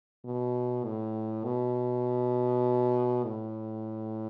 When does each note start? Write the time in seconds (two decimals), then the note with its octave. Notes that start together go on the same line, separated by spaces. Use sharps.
0.25 B2
0.85 A2
1.45 B2
3.24 A2